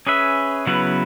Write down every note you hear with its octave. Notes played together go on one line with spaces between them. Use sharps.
C#4 G#4 B4 E5
C#3 F#3 B3 E4 B4